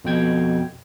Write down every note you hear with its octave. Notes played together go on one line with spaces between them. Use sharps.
F2 B2 G5 G#6